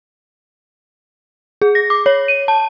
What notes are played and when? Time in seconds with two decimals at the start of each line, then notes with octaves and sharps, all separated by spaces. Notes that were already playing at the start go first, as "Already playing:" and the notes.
1.62 G#4
1.75 A#6
1.90 D6
2.06 C#5
2.28 D#7
2.48 A5